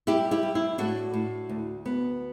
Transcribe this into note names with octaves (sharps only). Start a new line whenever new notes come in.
G3 E4 G4
E4 G4
G3
E4
A2 D4 F#4
A2
D2
B3